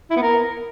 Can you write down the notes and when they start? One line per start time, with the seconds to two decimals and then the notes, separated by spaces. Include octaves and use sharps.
0.10 E4
0.16 B3
0.22 A#4